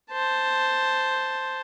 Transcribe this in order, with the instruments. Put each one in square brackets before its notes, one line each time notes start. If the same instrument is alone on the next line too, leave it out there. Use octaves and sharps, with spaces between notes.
[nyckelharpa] C5 A5